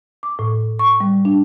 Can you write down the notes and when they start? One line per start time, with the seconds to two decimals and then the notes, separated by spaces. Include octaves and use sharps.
0.23 D6
0.39 A2
0.79 C#6
1.00 G3
1.25 D4